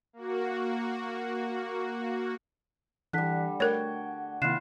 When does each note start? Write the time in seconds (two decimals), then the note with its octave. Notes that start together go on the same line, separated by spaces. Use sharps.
0.13 A#3 F#4
3.13 D3 E3 G3 F#6 B6
3.60 A3 F#4 A#4 C#5 G5 G#6
4.42 C3 D#3 A#3 E4 F4 F#6 C7 E7